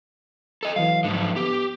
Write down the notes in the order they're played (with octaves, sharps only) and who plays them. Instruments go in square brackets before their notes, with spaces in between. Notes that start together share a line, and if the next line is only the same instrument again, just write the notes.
[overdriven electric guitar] A4 D#5
[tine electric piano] E3 F#3 [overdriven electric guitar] F5
[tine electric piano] G#2 F#3 [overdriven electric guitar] D3 F3
[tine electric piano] B3 [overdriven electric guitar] G4